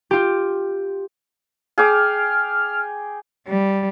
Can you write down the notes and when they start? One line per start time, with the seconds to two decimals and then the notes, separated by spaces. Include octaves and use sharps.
0.11 F4 G4
1.78 G#4 G5 D6 F6
3.46 G3